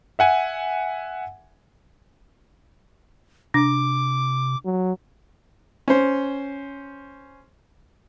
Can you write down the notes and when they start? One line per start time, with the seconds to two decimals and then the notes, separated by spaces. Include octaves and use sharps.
0.19 E5 F#5 G#5
3.54 C3 D4 D6
4.65 F#3
5.88 C#4 C5